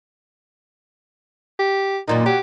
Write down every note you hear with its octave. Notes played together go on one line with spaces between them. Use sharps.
G4
F#2 A#2 D#3 D#4
F#3 G4